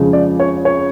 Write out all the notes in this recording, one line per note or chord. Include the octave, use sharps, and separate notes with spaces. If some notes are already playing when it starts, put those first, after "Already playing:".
Already playing: F2 C#3 F3 G#3
D5
C#5
C#5